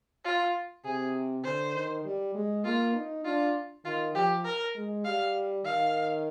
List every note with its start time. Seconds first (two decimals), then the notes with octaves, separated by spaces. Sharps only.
0.25 F4
0.85 C3 G#4
1.44 D3 C5
1.74 D#3
2.05 G3
2.35 G#3
2.65 A#3 F4
2.95 D#4
3.25 D4 F4
3.85 D#3 F4
4.15 F3 G4
4.45 A#4
4.75 G#3
5.05 G3 F5
5.65 D#3 F5